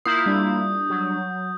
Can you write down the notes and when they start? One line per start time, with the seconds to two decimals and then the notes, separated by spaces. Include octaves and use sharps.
0.06 A#3 E4 F4 D#6 G6 C7
0.26 G3 D4
0.90 F#3